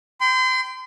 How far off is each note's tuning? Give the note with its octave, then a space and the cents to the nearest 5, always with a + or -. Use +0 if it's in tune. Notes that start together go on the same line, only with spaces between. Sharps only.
G5 +0 C6 -35